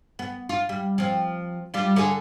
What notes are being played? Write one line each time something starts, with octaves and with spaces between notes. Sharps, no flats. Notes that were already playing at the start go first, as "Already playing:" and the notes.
B3
F4
G3
F3 C4
G3 D4 F4
D3 G#4